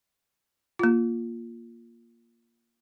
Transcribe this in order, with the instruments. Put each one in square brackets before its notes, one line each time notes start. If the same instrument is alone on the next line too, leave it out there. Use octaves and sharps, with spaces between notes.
[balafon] A#3 F4